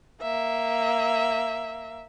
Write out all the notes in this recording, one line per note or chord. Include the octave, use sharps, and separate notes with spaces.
A#3 E5